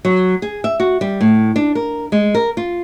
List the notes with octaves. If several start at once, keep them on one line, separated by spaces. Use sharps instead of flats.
F#3
G#4
E5
F#4
G3
A2
D4
A#4
G#3
A#4
F4